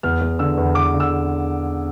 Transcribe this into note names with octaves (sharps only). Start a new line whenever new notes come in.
E2 F6
E2
D3 E6
E2
E2 D6
D3
E6